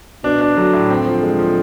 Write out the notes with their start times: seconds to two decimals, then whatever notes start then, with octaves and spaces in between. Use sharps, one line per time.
0.24 B2 D4
0.41 D4
0.57 D3 F#3
0.73 A2
0.90 C4
1.06 F3
1.23 G#3
1.39 F3